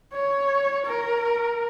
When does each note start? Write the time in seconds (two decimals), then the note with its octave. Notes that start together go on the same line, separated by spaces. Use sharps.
0.13 C#5
0.86 A#4